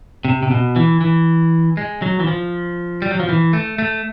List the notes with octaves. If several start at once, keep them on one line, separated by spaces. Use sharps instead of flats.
C3
C3
B2
E3
E3
G#3
F#3
E3
F3
G3
F#3
F3
E3
A3
A3